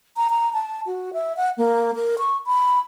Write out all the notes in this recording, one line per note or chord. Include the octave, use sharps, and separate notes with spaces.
A#5
A#5
A5
F#4
E5
F#5
A#3
A#4
C#6
B5